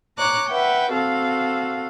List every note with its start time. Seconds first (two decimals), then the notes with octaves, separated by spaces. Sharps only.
0.18 C#5 A#5 D6 F#6
0.49 B4 E5 F#5 G5
0.92 C4 F#4 A4 F5